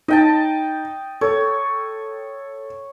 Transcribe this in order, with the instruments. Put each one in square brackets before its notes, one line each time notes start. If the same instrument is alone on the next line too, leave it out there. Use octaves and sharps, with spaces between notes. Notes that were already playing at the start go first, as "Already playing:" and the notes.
[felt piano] D#4 [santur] D#5 G5 A5
[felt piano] A4 [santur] C#5